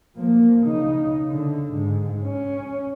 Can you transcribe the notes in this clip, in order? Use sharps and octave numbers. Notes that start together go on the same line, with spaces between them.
F3 A#3
C#3 D#4
D3
G#2
C#4